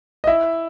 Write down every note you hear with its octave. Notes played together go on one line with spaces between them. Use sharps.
D#5
E4 E5